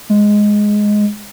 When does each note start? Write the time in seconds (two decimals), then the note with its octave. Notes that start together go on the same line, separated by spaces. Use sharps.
0.09 G#3